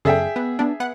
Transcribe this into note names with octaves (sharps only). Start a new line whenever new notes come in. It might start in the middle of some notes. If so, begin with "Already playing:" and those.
F#2 C#3 G#4 A4 E5 G5
B3
B3 D4
B3 F#5